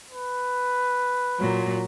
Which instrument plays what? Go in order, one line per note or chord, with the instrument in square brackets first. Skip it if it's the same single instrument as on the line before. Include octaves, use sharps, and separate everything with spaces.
[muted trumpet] B4
[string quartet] A#2 F#3